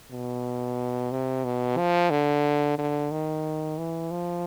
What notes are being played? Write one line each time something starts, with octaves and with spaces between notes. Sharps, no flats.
B2
C3
B2
F3
D3
D3
D#3
E3
F3